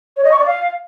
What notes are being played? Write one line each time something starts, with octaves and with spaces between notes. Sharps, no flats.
C#5
D#5
C#6
D5
F5